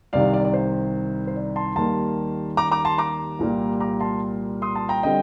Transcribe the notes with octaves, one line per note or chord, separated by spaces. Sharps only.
C2 C3 D#3 D5 F5
D5
D5
C5
C5
D5
A5 C6
D#2 D#3 G3 A#3 A5 C6
A#5 D6
A#5 D6
A5 C6
A#5 D6
C2 A#2 G3 A#3
A#5 D6
A5 C6
C6 D#6
A5 C6
G5 A#5
D3 G3 C4 D#5 G5